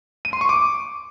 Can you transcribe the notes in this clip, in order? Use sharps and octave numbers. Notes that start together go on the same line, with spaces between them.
D#7
C6
C#6
D6